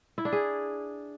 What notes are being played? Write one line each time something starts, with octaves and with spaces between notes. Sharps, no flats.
E4
D4
G#4